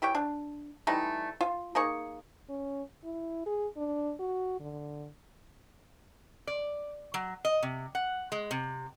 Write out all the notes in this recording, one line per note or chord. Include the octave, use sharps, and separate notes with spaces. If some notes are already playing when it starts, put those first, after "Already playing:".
E3 G4 C#5 G5
D4
E3 G3 A3 D#4
F4
A#3 D#4 G#4 C#6
C#4
E4
G#4
D4
F#4
D3
D5
F#3
D#5
C3
F#5
G#3
C3